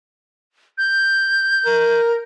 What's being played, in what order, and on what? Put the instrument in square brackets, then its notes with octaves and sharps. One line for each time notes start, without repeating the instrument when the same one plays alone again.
[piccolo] G6
[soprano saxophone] A#4